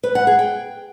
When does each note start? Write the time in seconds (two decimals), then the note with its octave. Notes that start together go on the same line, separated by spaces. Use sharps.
0.03 B4
0.15 F#5
0.27 G#4
0.39 G5